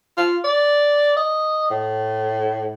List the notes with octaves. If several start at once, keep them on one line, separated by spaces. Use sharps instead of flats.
F4
D5
D#5
A2